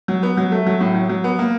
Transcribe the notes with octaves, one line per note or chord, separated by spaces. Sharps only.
F#3
B3
F#3
A3
F#3
A2
F#3
F#3
B3
A#3